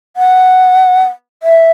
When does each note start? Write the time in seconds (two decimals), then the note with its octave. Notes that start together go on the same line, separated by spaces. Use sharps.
0.17 F#5
1.43 E5